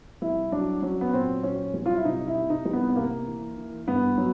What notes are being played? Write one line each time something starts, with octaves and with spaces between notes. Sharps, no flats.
C2 E4
F#3 D4
F#3 C#4
B3
A#2 C4
F#3 C#4
C2
F4
E4
C3 D#4
E4
C3
D#4
C2
B3
B3
C3 A#3
E3
E3
G2 B3
F#3